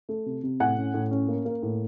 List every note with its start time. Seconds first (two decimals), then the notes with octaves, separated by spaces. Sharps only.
0.09 A3
0.26 C3
0.43 C3
0.60 A2 F#5 G#5
0.77 C#4
0.94 A2
1.11 C#4
1.28 A#3
1.45 A#3
1.63 A2